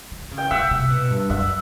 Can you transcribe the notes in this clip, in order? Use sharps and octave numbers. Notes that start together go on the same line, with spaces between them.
D#3
C#3
G5
C#3 E5 F#5
C3
B2
G2
F#2 E5 F#5